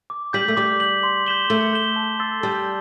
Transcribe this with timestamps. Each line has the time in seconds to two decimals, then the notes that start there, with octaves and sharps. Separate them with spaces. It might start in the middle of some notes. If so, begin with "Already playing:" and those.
0.10 D6
0.33 G3 G6 B6 F#7
0.48 A3
0.57 G3 D6
0.80 G6 B6 F#7
1.03 C6
1.26 G6 B6 E7 G7
1.49 A3 C6
1.73 G6 B6 E7 G7
1.96 A5
2.19 C6 E6 A6 C7
2.43 G3 A5